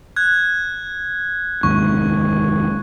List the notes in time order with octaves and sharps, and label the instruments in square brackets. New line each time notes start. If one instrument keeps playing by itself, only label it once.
[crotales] F#6 G#6
[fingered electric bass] F1 D#2 G#2 [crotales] C#6